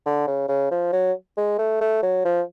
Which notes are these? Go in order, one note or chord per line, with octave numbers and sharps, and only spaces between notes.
D3
C#3
C#3
F3
F#3
G#3
A3
A3
F#3
F3